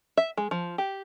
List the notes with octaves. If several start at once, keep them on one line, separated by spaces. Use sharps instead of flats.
E5
G#3
F3
G4